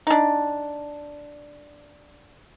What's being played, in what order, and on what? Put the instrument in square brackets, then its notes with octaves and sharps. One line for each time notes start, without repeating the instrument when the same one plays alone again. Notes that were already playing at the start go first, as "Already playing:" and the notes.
[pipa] D4 D#4